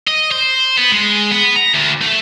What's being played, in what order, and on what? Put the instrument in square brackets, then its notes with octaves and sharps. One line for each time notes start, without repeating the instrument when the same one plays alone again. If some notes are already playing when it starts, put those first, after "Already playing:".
[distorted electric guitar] D#5
C5
B3
G#3
B3
A#5
D2
A3